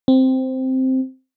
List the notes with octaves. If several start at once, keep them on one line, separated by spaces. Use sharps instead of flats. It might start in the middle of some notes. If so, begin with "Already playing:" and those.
C4